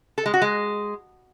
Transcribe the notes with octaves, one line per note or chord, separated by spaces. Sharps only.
A4
G#3
F#4
G#3